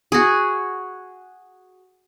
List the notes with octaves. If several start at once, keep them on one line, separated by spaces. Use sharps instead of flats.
F#4 G#4